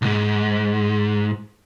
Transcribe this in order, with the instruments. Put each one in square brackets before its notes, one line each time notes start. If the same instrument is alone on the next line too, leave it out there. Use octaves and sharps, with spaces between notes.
[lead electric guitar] B1 G#2